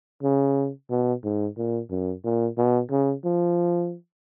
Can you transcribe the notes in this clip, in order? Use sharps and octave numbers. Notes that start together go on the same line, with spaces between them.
C#3
B2
G#2
A#2
F#2
A#2
B2
C#3
F3